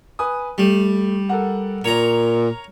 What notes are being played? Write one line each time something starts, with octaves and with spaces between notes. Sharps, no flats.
B4 G#5 D#6
G3 A3
A4 A#4 F#5
A#2 A#4 C#5 A#5